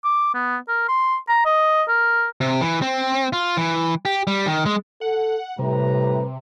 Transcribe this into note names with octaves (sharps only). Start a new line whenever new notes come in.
D6
B3
A#4
C6
A#5
D#5
A#4
C3
E3
C4
F4
E3
G4
G3
D#3
G#3
A4 F#5
A2 C3 G3 B4 A#5